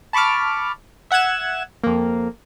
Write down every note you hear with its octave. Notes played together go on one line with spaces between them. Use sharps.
A5 B5 C#6 D6 F6
E5 F#5 F#6 G#6 E7
F2 A#3